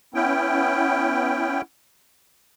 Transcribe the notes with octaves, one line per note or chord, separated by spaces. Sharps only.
B3 C#4 E4 G5